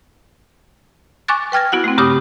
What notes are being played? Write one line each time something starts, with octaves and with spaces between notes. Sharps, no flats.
G#5 C#6 D6 F#6 A6
B4 G5 F6 G#6 A#6
B3 E4 F#4 F#5
A3 C4
G2 C#3 G4 B5 D6 D#6